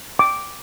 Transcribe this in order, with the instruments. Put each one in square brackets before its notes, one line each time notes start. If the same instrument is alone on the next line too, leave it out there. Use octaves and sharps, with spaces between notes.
[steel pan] D6